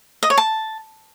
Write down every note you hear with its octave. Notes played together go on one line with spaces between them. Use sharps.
D#5
C#5
A5